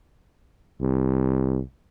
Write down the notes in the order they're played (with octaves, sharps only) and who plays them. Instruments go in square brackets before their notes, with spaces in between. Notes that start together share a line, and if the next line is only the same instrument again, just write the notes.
[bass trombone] C2